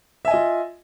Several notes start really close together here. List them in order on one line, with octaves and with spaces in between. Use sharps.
E5 G#5 D#5 F4